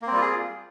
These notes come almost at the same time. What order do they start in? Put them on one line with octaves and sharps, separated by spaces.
A#3 C4 G3 F4 G#4